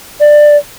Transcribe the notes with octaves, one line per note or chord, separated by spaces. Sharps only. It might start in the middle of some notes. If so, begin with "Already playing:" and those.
D5